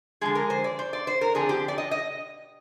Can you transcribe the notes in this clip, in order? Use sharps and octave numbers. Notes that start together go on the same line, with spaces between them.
D3 F3 G#3 G#4
A#4
C5
D5
C5
D5
C5
A#4
D3 F3 C4 G#4
G4
D5
D#5
D#5